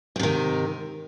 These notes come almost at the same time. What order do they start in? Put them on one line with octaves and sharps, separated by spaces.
G#2 C3 D#3